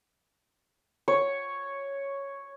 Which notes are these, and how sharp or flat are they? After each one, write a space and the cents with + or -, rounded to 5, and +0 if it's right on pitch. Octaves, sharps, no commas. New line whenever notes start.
C#5 +0